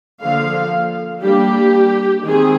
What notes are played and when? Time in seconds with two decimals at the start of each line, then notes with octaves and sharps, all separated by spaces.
0.21 D3 F3 A#3 F5
1.23 G3 A#3 D4 G4
2.25 D#3 G#3 C4 G#4